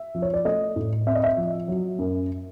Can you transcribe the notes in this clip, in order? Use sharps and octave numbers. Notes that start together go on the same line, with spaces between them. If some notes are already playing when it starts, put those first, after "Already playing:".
Already playing: E5
F3
C#5
D5
A3 D#5
A2
C4 E5
D#5
E5
F3
F#3
F#2